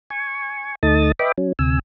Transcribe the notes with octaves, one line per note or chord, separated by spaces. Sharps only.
G#5 C#6
D2 A3 D#4 A5 D#6 A6
B4 D#5 E5 G5 B5 D6
F#3 C#4
D2 C3 G#5 E6